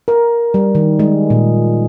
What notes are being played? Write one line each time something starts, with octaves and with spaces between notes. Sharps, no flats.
A#4
G3
D#3
G#3
A#2